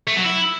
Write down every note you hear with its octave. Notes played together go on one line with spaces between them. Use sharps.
A3
F#3
E4